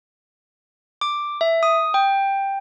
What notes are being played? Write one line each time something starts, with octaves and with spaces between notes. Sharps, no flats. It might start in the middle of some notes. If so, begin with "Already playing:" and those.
D6
E5
D#6
G5